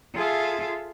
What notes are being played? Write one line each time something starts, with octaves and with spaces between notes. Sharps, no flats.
F4 G#4 A4 E5 F5